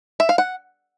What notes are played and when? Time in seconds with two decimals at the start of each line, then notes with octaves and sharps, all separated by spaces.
0.20 E5
0.29 F5
0.38 F#5